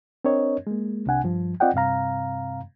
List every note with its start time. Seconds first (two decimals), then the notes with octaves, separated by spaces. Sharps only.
0.24 C4 D4 A#4 C#5 D#5
0.67 G#3 A#3
1.06 C2 C3 D4 F#5 G#5
1.24 G2 F3
1.60 C4 F4 D5 D#5 F#5 G5
1.74 G2 C3 C4 F5 A#5